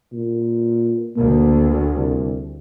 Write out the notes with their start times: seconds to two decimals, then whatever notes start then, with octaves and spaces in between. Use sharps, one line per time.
0.13 A#2
1.16 D2 A#3
1.96 C2